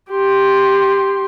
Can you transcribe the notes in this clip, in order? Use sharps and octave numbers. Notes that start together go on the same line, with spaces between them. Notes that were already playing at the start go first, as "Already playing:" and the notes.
G4 C6